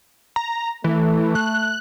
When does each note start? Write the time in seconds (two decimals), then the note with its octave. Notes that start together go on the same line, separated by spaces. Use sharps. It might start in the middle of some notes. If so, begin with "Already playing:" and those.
0.36 A#5
0.84 E3 A3
1.35 F#6